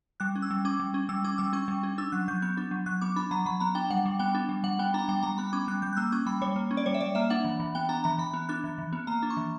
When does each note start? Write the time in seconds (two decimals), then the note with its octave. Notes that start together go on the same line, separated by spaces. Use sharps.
0.20 G3 F#6
0.35 C#4
0.42 E6
0.51 G3
0.65 C#4 D6
0.80 G3
0.94 C#4
1.09 G3 E6
1.24 C#4 D6
1.38 G3 E6
1.53 C#4 C#6
1.68 G3
1.83 C#4
1.98 D4 E6
2.12 F#3 F#6
2.28 F#3 G6
2.42 B3 G6
2.57 D4
2.71 F#3
2.86 F#3 F#6
3.01 B3 D6
3.16 D4 B5
3.31 F#3 A#5
3.46 F#3 B5
3.60 B3 A#5
3.75 D4 G5
3.90 G3 F#5
4.06 G3
4.19 B3 G5
4.35 D4
4.49 G3
4.64 G3 F#5
4.79 B3 G5
4.94 D4 A#5
5.08 G3 G5
5.23 G3 A#5
5.38 B3 B5
5.53 C#4 D6
5.68 G3 F#6
5.82 G3 G6
5.93 F#6
5.97 A#3 E6
6.12 C#4 D6
6.26 G3 B5
6.42 G3 C#5
6.56 A#3
6.71 C#4
6.77 D5
6.86 G3 C#5
6.94 E5
7.00 G3 D5
7.15 A#3 E5
7.30 D4 F#5
7.45 E3
7.60 E3
7.75 B3 G5
7.89 D4 A#5
8.04 E3 A#5
8.18 E3 B5
8.34 B3
8.49 D4 F#6
8.64 E3
8.78 E3
8.93 B3
9.07 A#3 A#5
9.23 D4
9.30 C#6
9.37 E3